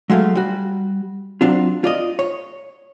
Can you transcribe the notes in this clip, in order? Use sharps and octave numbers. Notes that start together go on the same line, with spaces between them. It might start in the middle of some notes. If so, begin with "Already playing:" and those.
F#3 G#3 A3 F5
G3 F#4
F#3 C4 D4 F4
F4 D5 D#5
C#5